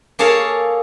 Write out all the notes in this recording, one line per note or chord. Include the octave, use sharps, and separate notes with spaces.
A#3 G#4 A4 C#5 F5 A5